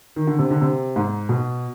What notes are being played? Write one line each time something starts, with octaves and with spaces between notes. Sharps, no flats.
D#3
D3
C3
D3
C3
G#2
B2